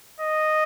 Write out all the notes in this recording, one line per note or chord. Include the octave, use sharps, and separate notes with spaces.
D#5